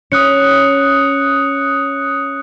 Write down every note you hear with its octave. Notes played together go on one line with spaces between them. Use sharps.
C#4 D#6 F#6 C#7